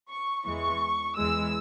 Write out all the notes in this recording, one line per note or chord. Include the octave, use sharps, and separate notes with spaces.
C#6
E2 E3 G#3 C#6
E2 E3 G#3 E6